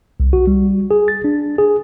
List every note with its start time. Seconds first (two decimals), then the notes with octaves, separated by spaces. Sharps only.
0.20 C2
0.33 F#4
0.47 G3
0.91 G#4
1.08 A6
1.24 D4
1.58 G#4